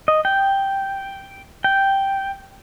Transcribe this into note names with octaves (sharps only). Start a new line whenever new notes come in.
D#5
G5
G5